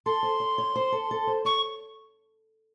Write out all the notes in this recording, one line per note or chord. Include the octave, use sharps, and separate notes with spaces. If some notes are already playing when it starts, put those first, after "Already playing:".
A4 C6
C5
C#5
C#5
C5
A4
A4
C5
C#5 C#6